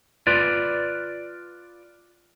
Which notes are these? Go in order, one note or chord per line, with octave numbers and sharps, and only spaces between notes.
F4 B4 D5